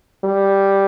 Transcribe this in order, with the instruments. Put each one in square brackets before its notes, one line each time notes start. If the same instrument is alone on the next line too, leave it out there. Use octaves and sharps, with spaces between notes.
[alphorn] G3